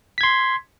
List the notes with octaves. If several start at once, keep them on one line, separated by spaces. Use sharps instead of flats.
C6 G#6 B6